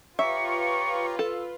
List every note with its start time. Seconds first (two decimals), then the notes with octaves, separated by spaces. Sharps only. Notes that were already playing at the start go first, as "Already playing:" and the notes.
0.19 F4 G4 B4 C#5 E5 A#5 C#6
1.19 A4